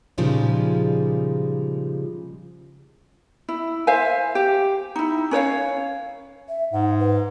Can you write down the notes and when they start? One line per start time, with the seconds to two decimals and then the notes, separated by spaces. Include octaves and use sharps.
0.18 A#2 C#3 F3 G3 G#3 D#4
3.49 E4
3.87 C5 E5 F5 G#5
4.35 G4
4.96 D#4 E4
5.31 C#4 B4 C#5 F5
6.49 E5
6.73 G#2 F#5
6.99 B4